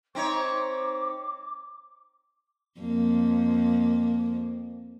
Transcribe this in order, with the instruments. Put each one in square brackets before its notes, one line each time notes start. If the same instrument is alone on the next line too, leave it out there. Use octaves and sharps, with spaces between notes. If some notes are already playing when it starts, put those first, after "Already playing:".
[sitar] C4 D#4 C#5 [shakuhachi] D6
[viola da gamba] F2 A#3